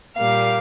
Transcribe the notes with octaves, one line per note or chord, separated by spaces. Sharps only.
A#2 G3 A#3 F5